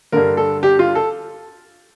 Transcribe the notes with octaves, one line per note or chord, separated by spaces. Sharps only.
G2 D3 A#4
A4
G4
F4
A4